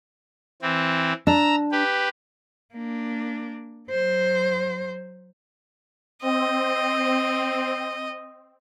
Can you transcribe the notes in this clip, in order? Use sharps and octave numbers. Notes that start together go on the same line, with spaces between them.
E3 C4
D4 A#5 E6
G4 B4
A#3 D4
F#3 C5
C4 D#5